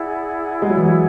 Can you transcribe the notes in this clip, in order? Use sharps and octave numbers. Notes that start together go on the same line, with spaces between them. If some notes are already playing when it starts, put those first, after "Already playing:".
Already playing: E4 G#4 D5 F#5
G#3
F#3
E3
F#3